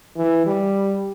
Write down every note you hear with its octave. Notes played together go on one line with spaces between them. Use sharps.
E3
G3